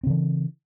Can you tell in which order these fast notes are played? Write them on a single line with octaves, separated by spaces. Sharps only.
C4 C#3 E3